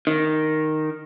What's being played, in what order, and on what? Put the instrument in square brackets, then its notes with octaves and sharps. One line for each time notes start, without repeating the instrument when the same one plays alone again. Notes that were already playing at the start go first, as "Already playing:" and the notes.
[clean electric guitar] D#3